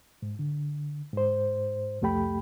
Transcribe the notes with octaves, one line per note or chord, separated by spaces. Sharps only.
G#2
D3
G#2 C5
C2 F2 A3 G4 G5 B5